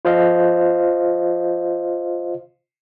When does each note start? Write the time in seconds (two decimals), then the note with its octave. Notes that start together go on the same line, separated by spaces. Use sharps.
0.05 F4 C5 D#5 F5